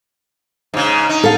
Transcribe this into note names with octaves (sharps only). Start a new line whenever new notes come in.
G#2 C#3
D#4
A4 F5